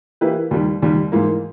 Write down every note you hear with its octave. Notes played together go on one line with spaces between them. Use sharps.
E3 A#3 E4 G4 B4
D#2 D#3 G3
D#2 D#3 G3
G#2 E3 A#3